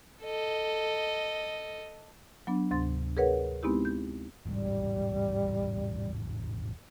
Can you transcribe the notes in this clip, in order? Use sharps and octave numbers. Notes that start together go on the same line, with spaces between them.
A4 D#5
F#3 B3 D4
D2 G#2 C3 C6 A6
G#4 A#4 B4 C#5 F#5
G#3 B3 C4 D#4 E4 G4
G6
E1 A1 G#2 G3